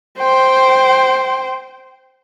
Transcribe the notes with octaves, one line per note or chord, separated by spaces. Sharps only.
C5 G5